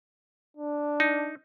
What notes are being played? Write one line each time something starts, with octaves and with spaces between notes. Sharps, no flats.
D4
D#4